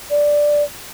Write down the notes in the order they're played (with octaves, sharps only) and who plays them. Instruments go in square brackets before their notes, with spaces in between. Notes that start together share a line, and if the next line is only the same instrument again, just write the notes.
[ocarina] D5